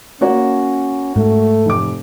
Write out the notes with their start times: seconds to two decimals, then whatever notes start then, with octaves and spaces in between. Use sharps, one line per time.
0.21 A#3 C#4 F#4 C#5
1.16 G#2 A3
1.66 F1 D6